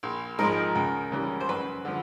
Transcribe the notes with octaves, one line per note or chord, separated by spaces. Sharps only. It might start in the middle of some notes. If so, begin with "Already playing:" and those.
A#1
G#2 F3 G#3 A#4
C#2
C#3 E3 G3
C5
F#2 B4
D3 F3